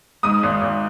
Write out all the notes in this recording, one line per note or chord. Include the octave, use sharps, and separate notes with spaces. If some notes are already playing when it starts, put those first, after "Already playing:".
G#2 D#6
G#1
G#1